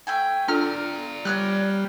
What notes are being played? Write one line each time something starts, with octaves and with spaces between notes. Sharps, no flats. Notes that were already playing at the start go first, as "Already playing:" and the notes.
A3 G5 G#5
D4 F4 A4 D5 A#5 F6
G3 C#5 F6 F#6